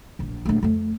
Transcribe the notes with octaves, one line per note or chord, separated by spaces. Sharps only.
D1 A#1
A#1 A3
F2 A3